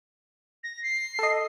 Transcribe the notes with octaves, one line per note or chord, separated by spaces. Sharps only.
A#6
C7
A4 D#5